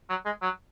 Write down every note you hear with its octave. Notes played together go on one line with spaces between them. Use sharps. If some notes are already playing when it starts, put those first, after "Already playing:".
F#3
G#3
F#3